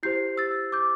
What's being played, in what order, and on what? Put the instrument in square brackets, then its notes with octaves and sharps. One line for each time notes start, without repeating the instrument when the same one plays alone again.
[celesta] E4 G4 C5 G6 C7
E6 A6
D6 G6